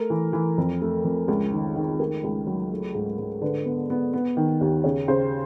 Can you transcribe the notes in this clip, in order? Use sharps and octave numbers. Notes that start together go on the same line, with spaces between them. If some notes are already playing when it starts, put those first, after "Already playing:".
Already playing: A3 A#4
E3
E3
F2
A3
F2
C#2
D#3
D#3
A3 A#4
C#2
F#3
A3
G#2
G#2
D3 B4
B3
B3
B3
D#3
D#2
C#3 C#5
C#3 C5